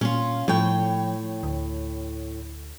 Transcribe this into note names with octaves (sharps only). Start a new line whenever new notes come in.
A#2 C#4 F4
A2 F3 C#5 G5
D2